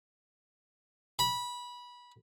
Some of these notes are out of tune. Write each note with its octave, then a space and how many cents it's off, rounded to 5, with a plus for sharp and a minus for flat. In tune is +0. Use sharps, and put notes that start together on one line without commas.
B5 -20